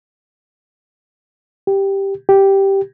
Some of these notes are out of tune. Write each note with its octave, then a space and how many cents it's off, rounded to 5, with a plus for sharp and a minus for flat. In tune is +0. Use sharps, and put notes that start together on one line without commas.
G4 +0
G4 -5